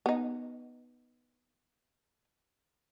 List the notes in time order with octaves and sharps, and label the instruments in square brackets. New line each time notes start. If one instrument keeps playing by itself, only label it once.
[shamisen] B3 D#4